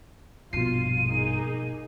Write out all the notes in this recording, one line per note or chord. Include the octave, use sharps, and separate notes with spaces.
A#1 G2 B2 F4 C7 D#7
A#3 D#4 G#4